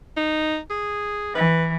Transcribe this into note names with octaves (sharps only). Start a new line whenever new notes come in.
D#4
G#4
E3 B4